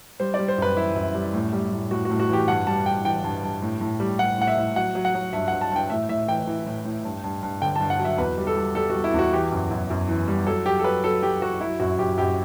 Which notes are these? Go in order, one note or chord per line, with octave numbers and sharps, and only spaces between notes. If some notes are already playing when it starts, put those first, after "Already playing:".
G3 C5
D5
G3
C5
F#2 B4
E3 E4
F#2
G3
A2
G3
A2
A2 F#4
F#4
A2
F#4
E3 G4
G2 F#5
G3 A5
G2 G5
E3 G5
G2
G2
A2
A2
G3
G3 F#5
A2 F#5
E5
A2
F#3 F#5
F#3
F#5
F#3
G2 E5
G2 F#5
A5
G2 G5
A2 E5
A2 E5
E3 G5
E3
A2
A2
G2
G2
G2
D3 G5
G2 A5
F#5
F#3
E5
E2 B4
G3
A4
G3
G3 A4
G3 F#4
E4
E2 F#4
E3 G4
F#2
F#2
F#2
E3
G3
F#3 A4
F#3 G4
A4
F#3 B4
F#3 A4
F#3 G4
F#3 F#4
F#3 E4
F#2 F#4
F#2 G4
F#2 G4